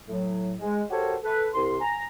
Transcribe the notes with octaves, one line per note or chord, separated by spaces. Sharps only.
A2 F#3
G#3
F#4 G4 A4 A#4 C5 C#5
A4 B4
C2 C6
G#5 A#5